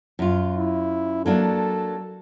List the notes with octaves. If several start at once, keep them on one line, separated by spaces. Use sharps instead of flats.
F#2 F4
E4
F#3 A#3 D4 A4